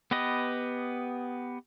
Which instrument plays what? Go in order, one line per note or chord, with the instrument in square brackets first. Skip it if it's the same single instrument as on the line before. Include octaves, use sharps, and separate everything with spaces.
[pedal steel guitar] B3 G4 B4 D#5